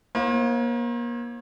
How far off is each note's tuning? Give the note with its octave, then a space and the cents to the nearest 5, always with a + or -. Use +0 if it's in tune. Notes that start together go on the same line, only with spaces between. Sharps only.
A#3 +35 E4 -15 C5 +45